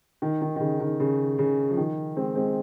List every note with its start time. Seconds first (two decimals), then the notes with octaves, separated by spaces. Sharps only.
0.22 D#3
0.41 D#3
0.56 D#3
0.60 C#3
0.80 D#3
1.00 C#3
1.39 C#3
1.71 F3
1.77 D#3
2.16 G#3 C4
2.35 G#3 C4